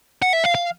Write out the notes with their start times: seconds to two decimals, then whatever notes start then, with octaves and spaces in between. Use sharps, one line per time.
0.22 F#5
0.33 E5
0.44 F5
0.55 F5